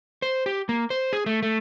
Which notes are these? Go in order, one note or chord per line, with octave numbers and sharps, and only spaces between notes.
C5
G4
A#3
C5
G#4
A3
A3